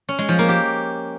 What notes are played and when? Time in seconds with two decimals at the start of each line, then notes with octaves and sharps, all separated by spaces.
0.09 C#4
0.19 G#3
0.29 F3
0.39 A#3
0.49 G4